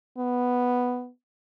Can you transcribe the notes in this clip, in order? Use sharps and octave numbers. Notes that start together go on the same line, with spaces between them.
B3